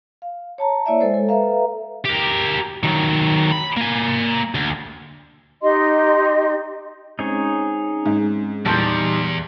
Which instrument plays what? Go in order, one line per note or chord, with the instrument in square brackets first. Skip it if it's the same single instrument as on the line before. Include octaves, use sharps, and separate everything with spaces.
[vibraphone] F5
C#5 A5 A#5
A#3 E4 C#5 D5 E5
G#3 A4 C5
A4
A4 B4 E5 F5 A#5
[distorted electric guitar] G4 A#4
D#3 F#3
B5
A#3 G#5
D2
[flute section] D#4 G4 D#5 C6
[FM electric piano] G#3 C4 C#4 [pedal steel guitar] D#4 G#4 C#5
[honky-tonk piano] G#2
[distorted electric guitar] E2 [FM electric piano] A#2 E3 [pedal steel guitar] G3 D#4 [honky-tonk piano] A5 C6 G6